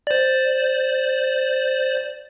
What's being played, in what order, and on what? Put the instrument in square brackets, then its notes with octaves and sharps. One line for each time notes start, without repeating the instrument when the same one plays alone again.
[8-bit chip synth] C5 D5